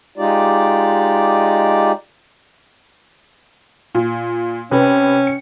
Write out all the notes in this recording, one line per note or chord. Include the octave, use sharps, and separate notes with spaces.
G#3 D#4 F4 G4 D5
A#2
C3 C#4 B4
C#7